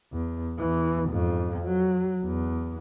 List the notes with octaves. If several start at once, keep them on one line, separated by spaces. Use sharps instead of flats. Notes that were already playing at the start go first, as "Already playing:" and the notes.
E2
E2 E3
F2 G#2
F#3
E2